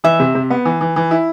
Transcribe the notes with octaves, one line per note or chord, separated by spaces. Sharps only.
E3 E5
C3
C3
B3
E3
E3
E3
E4